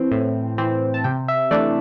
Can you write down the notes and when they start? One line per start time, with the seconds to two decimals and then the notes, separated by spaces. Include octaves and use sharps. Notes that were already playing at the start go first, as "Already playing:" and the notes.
Already playing: E3 C4
0.11 A2
0.58 E3 C4
0.94 A5
1.04 C3 G5
1.28 E5
1.51 E3 A3 D4 D5